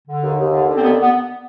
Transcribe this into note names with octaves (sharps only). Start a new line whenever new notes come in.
D3
D#2
D#2
D3
D3
C4
D#2 B3
B3